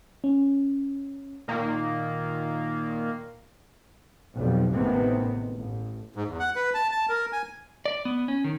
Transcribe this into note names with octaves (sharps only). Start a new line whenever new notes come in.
C#4
A#2 D#3 A#3
B1 F2 G3
A1 C3 D#3 G#3 B3 C4
A1
G#2
E2
F#5
B4
A5
A5
A#4
G#5
D5
B3
C#4
D#3